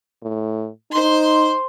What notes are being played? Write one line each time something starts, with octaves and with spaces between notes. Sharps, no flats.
A2
D#4 C5 C6